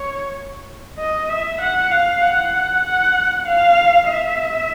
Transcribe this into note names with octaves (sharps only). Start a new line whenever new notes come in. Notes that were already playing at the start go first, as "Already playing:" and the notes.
Already playing: C#5
D#5
E5
F#5
F5
F#5
F#5
F5
E5